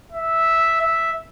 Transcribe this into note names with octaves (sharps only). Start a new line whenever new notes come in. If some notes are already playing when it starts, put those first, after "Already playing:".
E5
E5